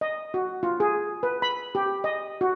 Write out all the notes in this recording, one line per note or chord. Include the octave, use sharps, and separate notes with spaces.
D#5
F#4
F4
G#4
B4
B5
G4
D#5
F#4